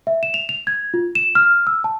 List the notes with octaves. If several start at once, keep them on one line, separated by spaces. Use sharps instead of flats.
E5
E7
F7
F7
G#6
F4
E7
F6
E6
A5